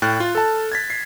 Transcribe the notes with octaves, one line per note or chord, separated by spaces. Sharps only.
A2 G5 F6 F#6 A6
F4
A4 A5
G#6 A6 B6
C7